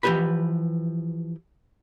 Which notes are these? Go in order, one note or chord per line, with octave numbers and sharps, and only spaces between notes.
E3 F3 G4 B4 B5